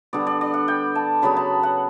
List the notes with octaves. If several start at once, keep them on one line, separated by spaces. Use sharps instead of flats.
D3 G3 B3 D5
D5
D5
F#5
G5
A5
C#3 F#3 B3 B5
A5
F#5